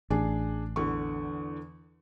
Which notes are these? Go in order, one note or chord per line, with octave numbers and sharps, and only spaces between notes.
A1 D4 G#4
E2 D3 C#6